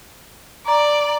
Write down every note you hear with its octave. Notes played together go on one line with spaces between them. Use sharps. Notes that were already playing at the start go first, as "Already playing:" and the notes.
D5 A#5